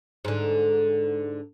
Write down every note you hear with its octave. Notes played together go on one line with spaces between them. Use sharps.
G#2 D3